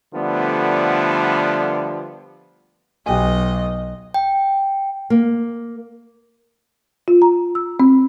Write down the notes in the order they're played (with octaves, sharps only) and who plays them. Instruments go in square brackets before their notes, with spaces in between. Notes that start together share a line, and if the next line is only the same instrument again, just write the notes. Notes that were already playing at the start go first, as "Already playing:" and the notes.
[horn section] D3 F3 G3 A3 B3
[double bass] B1 [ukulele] G4 B4 G#5 [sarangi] D#5
[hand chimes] G5
[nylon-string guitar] A#3
[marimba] F4
A#5
E6
C4